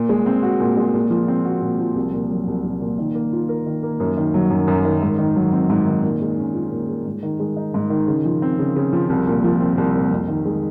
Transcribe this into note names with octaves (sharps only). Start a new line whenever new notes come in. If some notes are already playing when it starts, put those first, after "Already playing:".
Already playing: A#2
G#3
C4
F#4
A#2
G#3
A#2
F3
C4
F#4
A#2
F3
C2
A#2
F#3
C2
C2
A#2
D#3
A#3
F4
A#4
D#3
A#3
F#2
D#3
F#3
F#2
F#2
D#3
G#2
D#3
F#3
C4
G#2
D#3
A#2
G#3
C#4
F4
A#2
G#3
G#2
D#3
G#3
D#4
G#2
D#3
C#3
F3
C4
C#3
C#3
F3
C2
A#2
F3
C4
C2
A#2
F2
D#3
G#3